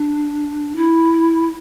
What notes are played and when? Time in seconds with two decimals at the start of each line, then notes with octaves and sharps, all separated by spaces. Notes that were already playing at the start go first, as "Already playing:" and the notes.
Already playing: D4
0.76 E4